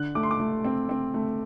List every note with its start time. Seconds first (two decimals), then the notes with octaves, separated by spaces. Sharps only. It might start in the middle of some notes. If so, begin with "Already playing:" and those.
Already playing: D3 F#6
0.15 A3 D6
0.23 C6
0.31 D6
0.40 A3
0.64 C4
0.89 C4
1.14 A3